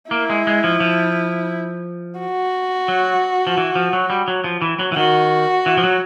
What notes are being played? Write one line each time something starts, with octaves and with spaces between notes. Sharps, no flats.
A#3 E4
G#3
G#3
F3
F3
F#4
F#3
F3
E3
F3
F#3
G3
F#3
F3
E3
F#3
E3
D#3 F#4
E3
F3
F#3